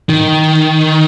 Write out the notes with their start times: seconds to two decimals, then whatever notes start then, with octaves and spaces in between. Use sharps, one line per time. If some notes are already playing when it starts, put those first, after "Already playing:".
0.09 D#3